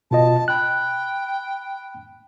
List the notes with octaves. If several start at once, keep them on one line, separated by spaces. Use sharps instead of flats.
B2 F4 D#5 A5
G5 B5 F#6